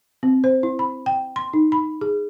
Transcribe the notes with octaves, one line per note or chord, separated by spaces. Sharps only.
C4
C5
E4
B5
G5
C6
D#4
B5
G#4